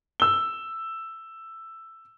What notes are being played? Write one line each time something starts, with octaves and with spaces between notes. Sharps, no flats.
E6 G7